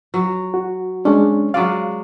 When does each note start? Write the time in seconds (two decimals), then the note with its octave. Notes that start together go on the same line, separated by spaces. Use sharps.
0.14 F#3
0.54 F#4
1.05 G#3 C#4 D4
1.54 F#3 G#3 D5 F5